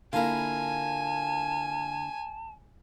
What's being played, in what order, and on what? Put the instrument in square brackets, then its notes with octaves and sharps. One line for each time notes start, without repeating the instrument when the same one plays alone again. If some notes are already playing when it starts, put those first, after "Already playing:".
[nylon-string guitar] D3 A#3 E4 [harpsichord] F4 A#4 [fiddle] G#5 [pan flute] A5